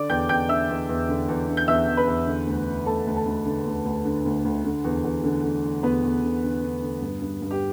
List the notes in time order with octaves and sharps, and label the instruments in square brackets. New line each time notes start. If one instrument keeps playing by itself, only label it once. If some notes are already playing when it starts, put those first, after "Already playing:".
Already playing: [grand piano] D3 D5 D6
E2 G5 G6
E2 G5 G6
D3 E5 E6
E2
E2
D3
E2
D3
G6
E2 E5 E6
E2
B4 B5
E2
D3
D2
D3
D2 A4 A5
D2
A4 A5
D2
D3
D2
D2
D3
D2
D2
D3
E2
E2
D3
D3
D3
E2 B3 B4
E2
D3
D3
D3
D3
G2
G2
G2
G4